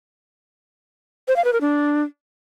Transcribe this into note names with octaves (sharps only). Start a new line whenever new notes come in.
C5
F5
B4
A#4
D4